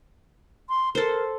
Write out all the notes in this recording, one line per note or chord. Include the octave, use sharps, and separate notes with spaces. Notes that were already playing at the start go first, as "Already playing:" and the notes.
C6
A4 A#4 C5